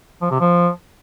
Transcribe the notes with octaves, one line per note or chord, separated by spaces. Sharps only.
F3
C3
F3